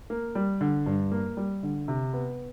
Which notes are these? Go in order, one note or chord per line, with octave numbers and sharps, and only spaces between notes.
A#3
G3
D3
G2
A#3
G3
D3
C3
B3